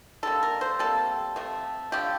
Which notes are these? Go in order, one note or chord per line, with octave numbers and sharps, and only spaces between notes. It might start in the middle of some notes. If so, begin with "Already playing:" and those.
D3 G3 A#3 A4
A#4
C5
C3 G3 A#3 A4
C3 F3 A3
D3 F3 A3 G4